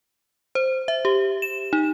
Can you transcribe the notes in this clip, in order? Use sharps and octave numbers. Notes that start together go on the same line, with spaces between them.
C5
E5
G4
E7
D#4